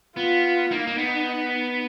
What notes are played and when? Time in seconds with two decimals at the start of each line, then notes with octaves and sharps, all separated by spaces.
0.17 B3 F4
0.71 A#3 D#4
0.87 A#3
0.98 B3